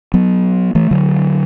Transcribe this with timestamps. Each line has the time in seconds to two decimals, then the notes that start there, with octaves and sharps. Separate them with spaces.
0.14 F#3 B3
0.75 E3 A3
0.91 D3 F#3